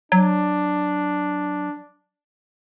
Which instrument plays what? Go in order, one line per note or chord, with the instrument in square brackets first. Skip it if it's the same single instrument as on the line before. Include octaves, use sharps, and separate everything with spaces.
[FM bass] F#3 [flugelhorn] D4